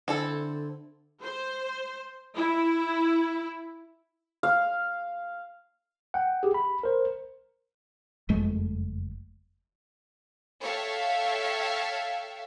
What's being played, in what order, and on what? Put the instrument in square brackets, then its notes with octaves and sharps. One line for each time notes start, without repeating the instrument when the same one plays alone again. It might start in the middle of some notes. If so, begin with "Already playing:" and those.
[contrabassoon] D3 [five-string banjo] C4 E4 A4
[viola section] C5
E4
[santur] F5
[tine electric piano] F#5 G5
G4 G#4
B5
A#4 C5
[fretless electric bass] F#1 F2 G#3 A3
[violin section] A4 C#5 E5 F5 G5 A5